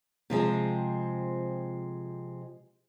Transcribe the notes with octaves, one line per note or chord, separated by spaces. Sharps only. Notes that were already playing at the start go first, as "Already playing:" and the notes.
C3 F3 G#3 C4